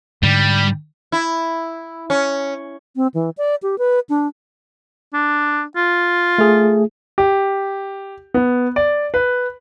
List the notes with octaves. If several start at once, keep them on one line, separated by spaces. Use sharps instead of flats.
G#2 D3 G3
E4
C#4
C4
E3
D5
G4
B4
D4
D4
F4
A3 G#4
G4
B3
D5
B4